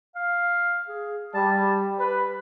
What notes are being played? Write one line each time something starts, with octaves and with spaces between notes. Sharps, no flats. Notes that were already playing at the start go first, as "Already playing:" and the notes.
F5
G#4
G3 A5
G4
B4